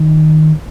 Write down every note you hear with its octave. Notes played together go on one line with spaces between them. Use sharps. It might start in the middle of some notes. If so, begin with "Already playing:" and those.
Already playing: D#3